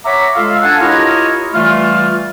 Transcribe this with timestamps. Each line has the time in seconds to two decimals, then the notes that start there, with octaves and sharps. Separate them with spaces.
0.06 C#5 E5 F#5 A#5 B5 D6
0.36 G#3 F4 A4 F5
0.62 D4 A4 F5 F#5 G#5 A5
0.79 E4 F4 G4 A#4 C#5 D#5
1.54 E3 G3 A3 F4